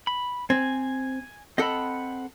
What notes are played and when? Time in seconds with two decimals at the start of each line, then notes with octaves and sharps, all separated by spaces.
0.07 B5
0.50 C4 G#5
1.58 C4 A4 D#5 F#5 B5